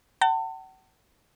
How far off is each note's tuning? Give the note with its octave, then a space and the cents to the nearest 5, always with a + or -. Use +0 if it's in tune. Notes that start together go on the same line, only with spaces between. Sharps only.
F#5 +45 A5 +35